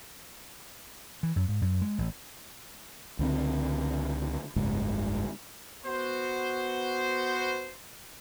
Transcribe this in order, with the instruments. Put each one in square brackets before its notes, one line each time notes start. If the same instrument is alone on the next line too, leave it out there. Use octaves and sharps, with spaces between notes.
[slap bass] E3
F#2
G#2
F#2
G#3
A1
[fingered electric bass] C#2 D3 C4
F#1 C#2 G#2
[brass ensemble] B3 F#4 C5